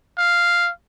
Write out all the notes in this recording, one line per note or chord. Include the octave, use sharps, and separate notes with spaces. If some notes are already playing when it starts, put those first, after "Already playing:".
F5